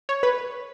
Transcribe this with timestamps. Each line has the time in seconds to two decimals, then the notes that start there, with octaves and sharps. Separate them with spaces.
0.09 C#5
0.23 B4